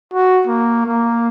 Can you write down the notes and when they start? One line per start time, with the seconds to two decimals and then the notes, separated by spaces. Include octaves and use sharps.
0.14 F#4
0.47 A#3
0.86 A#3